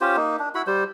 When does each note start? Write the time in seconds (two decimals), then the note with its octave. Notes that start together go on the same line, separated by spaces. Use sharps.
0.01 C#4 F4 G4 C5
0.17 A#3 D#4
0.39 D4
0.55 E4 F#4 F#5 B5
0.67 G3 C5